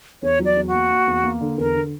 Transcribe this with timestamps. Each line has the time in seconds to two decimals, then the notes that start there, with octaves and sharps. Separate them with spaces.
0.22 E2 C#5
0.39 F#3
0.45 D5
0.57 E2
0.68 F#4
0.74 A#3
0.91 A#3
1.07 E2
1.24 A#3
1.41 D3
1.57 E2 A#4
1.75 D3